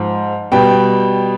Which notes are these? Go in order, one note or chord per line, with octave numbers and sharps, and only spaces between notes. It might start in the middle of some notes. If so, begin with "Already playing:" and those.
Already playing: G#2 F3
B2 G3 G5